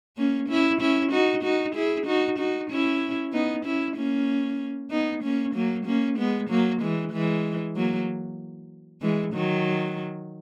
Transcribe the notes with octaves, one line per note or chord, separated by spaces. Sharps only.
A#3 C#4
C#4 E4
C#4 E4
D#4 F#4
D#4 F#4
E4 G#4
D#4 F#4
D#4 F#4
C#4 E4
B3 D#4
C#4 E4
A#3 C#4
B3 D#4
A#3 C#4
F#3 A#3
A#3 C#4
G#3 B3
F#3 A#3
E3 G#3
E3 G#3
F#3 A#3
E3 G#3
D#3 F#3